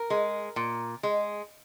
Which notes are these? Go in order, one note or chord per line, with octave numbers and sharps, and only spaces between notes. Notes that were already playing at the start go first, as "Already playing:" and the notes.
Already playing: A#4
G#3
A#2
G#3